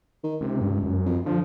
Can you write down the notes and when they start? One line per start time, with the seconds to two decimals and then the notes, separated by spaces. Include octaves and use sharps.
0.24 D#3
0.41 C#2 C3
0.61 G2
0.83 F#2
1.06 F2
1.26 D3 F3